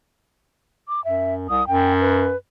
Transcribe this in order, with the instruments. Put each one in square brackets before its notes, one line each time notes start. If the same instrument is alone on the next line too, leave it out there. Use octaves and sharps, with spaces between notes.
[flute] D6
[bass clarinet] F#2 [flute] E5
[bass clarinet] C2 [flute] D#6
[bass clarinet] F#2 [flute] G5
[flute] B4